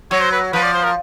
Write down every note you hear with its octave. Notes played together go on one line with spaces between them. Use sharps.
F#3 C#5
C5
B4
F3 B4
D5
C5
A#4